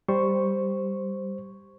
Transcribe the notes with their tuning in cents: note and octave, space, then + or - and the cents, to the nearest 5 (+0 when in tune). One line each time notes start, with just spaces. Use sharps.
G3 +0 C5 +0 C#6 +0